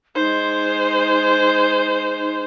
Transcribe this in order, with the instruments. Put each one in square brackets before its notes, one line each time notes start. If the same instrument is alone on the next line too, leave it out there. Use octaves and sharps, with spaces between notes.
[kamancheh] G#3 C5 [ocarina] D#4